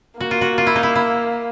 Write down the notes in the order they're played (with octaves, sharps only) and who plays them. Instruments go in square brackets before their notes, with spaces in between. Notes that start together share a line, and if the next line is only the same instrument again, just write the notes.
[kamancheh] A#3 [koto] F#4
[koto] F4
F#4
F4
E4
D#4
E4
E4